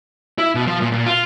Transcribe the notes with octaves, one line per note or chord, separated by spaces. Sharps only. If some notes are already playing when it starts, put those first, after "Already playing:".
E4
B2
F3
A#2
A#2
F4